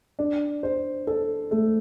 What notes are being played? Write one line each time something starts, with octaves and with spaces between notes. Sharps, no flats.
D4
C5
A4
A3